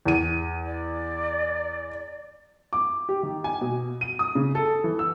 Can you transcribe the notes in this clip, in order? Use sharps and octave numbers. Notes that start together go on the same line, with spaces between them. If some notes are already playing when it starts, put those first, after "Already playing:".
E2 D#7
D5
D6
G4
D#3
G#5
B2
D#7
D#6
C#3
A4
E3
E6